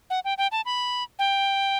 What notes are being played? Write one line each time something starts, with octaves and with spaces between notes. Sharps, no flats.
F#5
G5
G5
A5
B5
G5